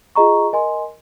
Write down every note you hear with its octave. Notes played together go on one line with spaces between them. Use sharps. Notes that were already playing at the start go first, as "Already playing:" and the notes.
F4 G#4 D#5 A#5 C#6
A#4 D#5 G#5 C6